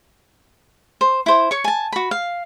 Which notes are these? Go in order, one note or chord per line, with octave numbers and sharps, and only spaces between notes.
C5
E4 C5
C#5 C#6
G#5 A5
F#4 B5
F5